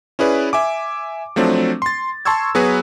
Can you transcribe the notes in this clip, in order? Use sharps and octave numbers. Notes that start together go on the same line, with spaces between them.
C#4 E4 G#4 B4 D5
E5 G#5 D6
F3 F#3 A3 C4 D4
C6 A6
A5 C6 C#6 E6 G#6
F#3 B3 F#4 G#4 B4